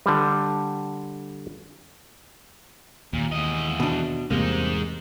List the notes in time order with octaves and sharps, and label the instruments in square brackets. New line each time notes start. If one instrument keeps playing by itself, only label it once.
[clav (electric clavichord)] D3 G3
[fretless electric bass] D#2 [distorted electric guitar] A#2
[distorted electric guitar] E2 D#5
[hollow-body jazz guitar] B2 D4
[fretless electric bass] E2 C3 [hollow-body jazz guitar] G3 A#3 C4 [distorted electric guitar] G#3 D#4